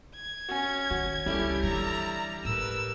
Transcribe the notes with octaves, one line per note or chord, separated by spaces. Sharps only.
G#6
C#4 F#4 G#5
D#3 F#4
C#2 G3 C#4 E4 G4 A4
E3 D4 D5 E5 A#5
A2 A#4 B4 E6